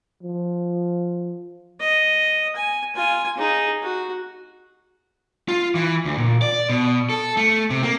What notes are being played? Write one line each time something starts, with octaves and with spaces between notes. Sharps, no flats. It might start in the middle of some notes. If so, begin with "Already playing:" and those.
F3
D#5
G#5
F4 G#5
D#4 G#4
F#4
F4
E3
D2
A#2
D5
B2
A4
A3
C3
A#3